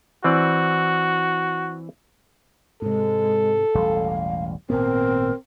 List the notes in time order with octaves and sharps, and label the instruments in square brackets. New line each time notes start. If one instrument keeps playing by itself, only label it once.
[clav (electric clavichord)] E3 C4 D5 [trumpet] F#4
[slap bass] G#2 C3 [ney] G#3 [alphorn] A4
[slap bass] E1 A1 G3 [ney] F5
[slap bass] G#1 A#2 B3 [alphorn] C4 [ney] A#4